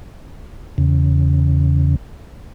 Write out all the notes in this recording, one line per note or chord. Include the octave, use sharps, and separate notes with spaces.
E2 C#3